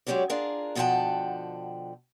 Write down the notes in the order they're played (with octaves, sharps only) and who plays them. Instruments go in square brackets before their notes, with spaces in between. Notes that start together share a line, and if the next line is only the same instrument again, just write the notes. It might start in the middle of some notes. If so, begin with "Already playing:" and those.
[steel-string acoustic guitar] F#3 G#3 C#4 G4 C#5 D5
D4 F4 G#4 A#4
B2 D3 F3 F#5 G5 A5